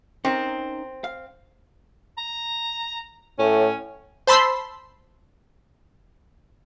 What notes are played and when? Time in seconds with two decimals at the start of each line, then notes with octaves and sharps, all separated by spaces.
0.25 C4 C#4 D#4 A#4
1.04 F5
2.18 A#5
3.39 A2 C#4
4.27 C5 A5 B5 C6 E6